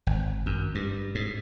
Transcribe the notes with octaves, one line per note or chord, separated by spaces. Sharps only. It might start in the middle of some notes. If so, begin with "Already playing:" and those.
G#1
F#2
G2
G#2